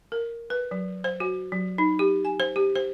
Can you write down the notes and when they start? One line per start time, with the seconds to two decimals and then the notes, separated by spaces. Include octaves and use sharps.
0.12 A#4
0.50 B4
0.71 F#3
1.04 C5
1.20 F#4
1.52 F#3
1.78 D#4
1.99 G4
2.25 G#5
2.40 C5
2.56 G4
2.75 C5